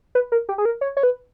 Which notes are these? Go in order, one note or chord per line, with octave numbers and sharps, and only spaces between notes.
B4
A#4
G4
G#4
A#4
C#5
C#5
B4